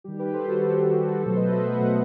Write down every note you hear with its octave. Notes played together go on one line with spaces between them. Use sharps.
D#3 G3 G4
G4 B4
A4 C5
F#4 A4
D#3 G3 G4
F#4 A4
B2 F#3 A3 A4 C5
B4 D#5
C5 E5
D#5 F#5
B2 F#3 A3